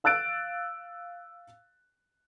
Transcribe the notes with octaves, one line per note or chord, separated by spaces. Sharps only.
F5 E6 F#6 A6 D7